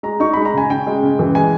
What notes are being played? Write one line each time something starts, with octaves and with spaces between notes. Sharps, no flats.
G#3 A#5
D#4 C#6
G#3 B5
A#5
C#3 G#5
C#3 G5
G#3
C#3
E3
G#3 G#5